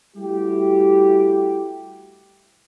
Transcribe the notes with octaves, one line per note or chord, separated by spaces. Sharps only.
G3 A3 E4 F#4 G4